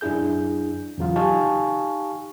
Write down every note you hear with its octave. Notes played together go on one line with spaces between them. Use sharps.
F#2 D4 E4 G#4 G6
E2 C#3 F#3 F4
D#4 G4 F5 G#5 A5 C#6